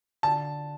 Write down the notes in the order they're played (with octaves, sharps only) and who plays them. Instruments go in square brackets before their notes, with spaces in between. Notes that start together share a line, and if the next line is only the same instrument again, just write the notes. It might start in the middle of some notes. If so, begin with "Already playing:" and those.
[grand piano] D3 A5